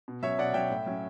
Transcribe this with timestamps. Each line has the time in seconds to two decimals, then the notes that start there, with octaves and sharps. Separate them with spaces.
0.08 B2
0.23 F#3 C#4 C#5 E5
0.39 B2 D5 F#5
0.54 F#3 C#4 E5 G5
0.70 A2
0.87 F#3 C#4